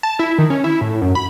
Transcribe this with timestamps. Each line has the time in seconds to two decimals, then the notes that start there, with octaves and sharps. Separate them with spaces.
0.03 A5
0.19 E4
0.38 D#3
0.50 C#4
0.64 E4
0.81 A2
1.01 F#2
1.15 B5